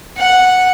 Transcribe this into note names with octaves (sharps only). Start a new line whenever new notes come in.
F#5